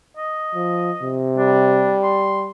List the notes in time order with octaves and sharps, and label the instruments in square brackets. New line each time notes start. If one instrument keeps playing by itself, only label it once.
[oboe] D#5
[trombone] F3
C3
[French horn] G3 [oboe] D4
[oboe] C6